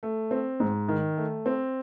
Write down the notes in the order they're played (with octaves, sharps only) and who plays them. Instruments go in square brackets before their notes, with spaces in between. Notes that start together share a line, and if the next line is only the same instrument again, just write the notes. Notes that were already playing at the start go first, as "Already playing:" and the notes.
[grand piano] A3
C4
G#2
D#3
A3
C4